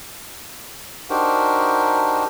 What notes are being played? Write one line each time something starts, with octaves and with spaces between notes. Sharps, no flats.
D4 D#4 F#4 G4 A#4 C5